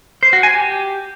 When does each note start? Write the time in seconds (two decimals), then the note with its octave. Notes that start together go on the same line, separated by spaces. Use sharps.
0.23 C5
0.33 F#4
0.43 G#5
0.54 G4